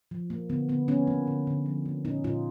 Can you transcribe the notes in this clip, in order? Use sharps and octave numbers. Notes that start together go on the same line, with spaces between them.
F3
A#3
D3 B3
D3 B3
F3 B3 C#4
A#3
D3
D3
F3
A#3
A#2 C#4 D#4
A#2 D#4 F4